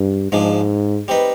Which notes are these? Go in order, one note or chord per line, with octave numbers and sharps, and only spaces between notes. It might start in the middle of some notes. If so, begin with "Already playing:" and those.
Already playing: G2
G#2 F3 G#3 D4
G3 C4 D#4 B4